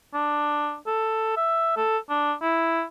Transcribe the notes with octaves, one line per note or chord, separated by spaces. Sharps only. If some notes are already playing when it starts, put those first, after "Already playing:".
D4
A4
E5
A4
D4
E4